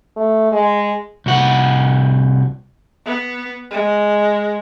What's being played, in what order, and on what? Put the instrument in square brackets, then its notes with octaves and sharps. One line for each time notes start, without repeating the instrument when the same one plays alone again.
[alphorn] A3
G#3
[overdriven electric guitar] C2 F#4
[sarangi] B3
G#3